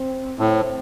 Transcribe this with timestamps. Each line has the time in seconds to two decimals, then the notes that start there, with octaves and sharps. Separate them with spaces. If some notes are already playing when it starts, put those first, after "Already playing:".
Already playing: C4
0.38 A2 C4